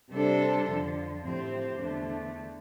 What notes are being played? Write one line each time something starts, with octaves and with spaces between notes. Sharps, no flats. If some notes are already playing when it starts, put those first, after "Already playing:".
C3 G3 D4 A4 C5
F2 D3 F3
A2 F3 C4 G4 C5
E2 D3 A3 D4